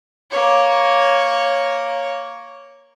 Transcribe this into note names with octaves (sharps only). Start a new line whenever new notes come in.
A#3 C#5